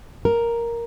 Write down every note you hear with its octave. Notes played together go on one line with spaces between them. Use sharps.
A#4